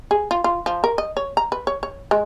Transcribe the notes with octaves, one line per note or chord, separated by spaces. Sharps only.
G#4
F4
F4
F3
A#4
D#5
C#5
A#5
B4
C#5
C#5
G#3